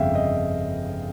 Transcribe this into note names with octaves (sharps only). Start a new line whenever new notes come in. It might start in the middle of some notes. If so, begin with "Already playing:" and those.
Already playing: G1 F2 C#3 E5 F5 G5
D#5